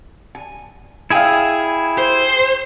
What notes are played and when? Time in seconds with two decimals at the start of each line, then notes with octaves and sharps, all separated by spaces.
0.35 G#5
1.10 E4 G#4 E5 F5 G5 G#5 G#6
1.98 C5